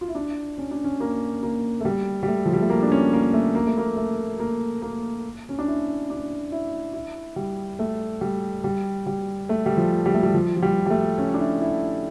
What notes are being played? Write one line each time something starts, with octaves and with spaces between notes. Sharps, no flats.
F4
E4
D4
C#4
D4
C#4
A#3
A#3
A3
G3
G3
A3
F3
G3
A3
A#3
D4
C#4
A#3
A3
A#3
A3
A#3
A3
A#3
A#3
C#4
D4
E4
D4
E4
E4
G3
A3
G3
G3
G3
A3
G3
F3
G3
A3
G3
F3
F3
G3
G3
A3
C#4
D4
E4
E4